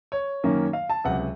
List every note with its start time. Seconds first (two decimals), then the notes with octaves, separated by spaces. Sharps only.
0.12 C#5
0.44 F#2 D#3 A#3 C#4
0.73 F5
0.90 A5
1.04 C#2 C3 F#3 F#5